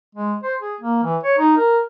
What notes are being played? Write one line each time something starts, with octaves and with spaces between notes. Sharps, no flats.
G#3
C5
G#4
A#3
E3
C#5
D#4
A#4